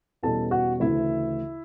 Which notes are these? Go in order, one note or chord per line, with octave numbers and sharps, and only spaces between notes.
E2 B2 G3 C#4 A4 A5
F#4 F#5
D2 C#3 E3 E4 E5